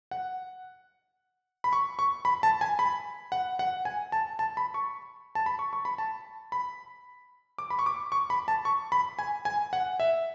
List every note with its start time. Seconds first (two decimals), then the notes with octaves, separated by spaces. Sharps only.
0.11 F#5
1.64 B5
1.73 C#6
1.99 C#6
2.25 B5
2.43 A5
2.61 G#5
2.79 B5
3.32 F#5
3.59 F#5
3.85 G#5
4.12 A5
4.39 A5
4.57 B5
4.74 C#6
5.35 A5
5.46 B5
5.59 C#6
5.73 C#6
5.85 B5
5.98 A5
6.52 B5
7.58 D6
7.70 B5
7.79 C#6
7.86 D6
8.12 C#6
8.30 B5
8.48 A5
8.65 C#6
8.92 B5
9.19 G#5
9.45 G#5
9.73 F#5
10.00 E5